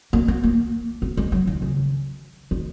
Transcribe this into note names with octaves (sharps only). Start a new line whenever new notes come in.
A#3
B3
A#3
B3
G#3
F#3
D#3
C#3
D#3